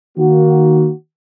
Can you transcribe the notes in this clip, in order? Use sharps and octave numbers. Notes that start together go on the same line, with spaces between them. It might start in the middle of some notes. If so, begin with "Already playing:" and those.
D#3 A#3 F#4